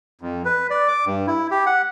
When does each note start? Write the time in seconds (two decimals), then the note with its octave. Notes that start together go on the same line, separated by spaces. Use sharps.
0.21 F2
0.45 B4
0.70 D5
0.88 D6
1.06 G2
1.27 E4
1.51 G4
1.66 F#5